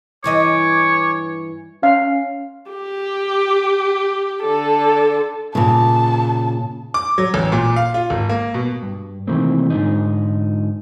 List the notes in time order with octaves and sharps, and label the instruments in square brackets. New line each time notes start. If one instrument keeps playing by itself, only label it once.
[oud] G2 E3 D#5 [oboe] C#5 [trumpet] D6
[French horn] C#4 [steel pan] F5
[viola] G4
D3 A4
[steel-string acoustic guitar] A#2 C#3 [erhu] A5
[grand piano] D6
F#3
A1
A#2
F5
F4
G#1
A#3
B2
[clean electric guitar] G2
C3 D#3 E3 A3 A#3 C4
G#2 D3 D#4